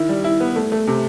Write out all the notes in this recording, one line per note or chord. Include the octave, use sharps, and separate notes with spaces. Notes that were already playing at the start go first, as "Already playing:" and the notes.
Already playing: D#3 E4
G3
E4
B3
A3
A3
C3